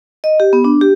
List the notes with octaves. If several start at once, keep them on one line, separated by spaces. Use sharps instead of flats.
D#5
G4
B3
D4
G4